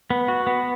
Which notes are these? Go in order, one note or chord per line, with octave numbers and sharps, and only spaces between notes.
B3
F#4
B3